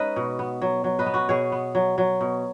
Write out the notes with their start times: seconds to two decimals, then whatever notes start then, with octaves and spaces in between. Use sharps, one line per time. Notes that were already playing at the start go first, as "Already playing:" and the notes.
Already playing: G#3 C#4 D#4 B4 D#5
0.16 B2
0.39 B3
0.62 F#3
0.84 F#3
0.99 B4 D#5
1.06 B3
1.14 F#4 B4
1.29 B2 G#4 C#5
1.52 B3
1.75 F#3
1.98 F#3
2.21 B2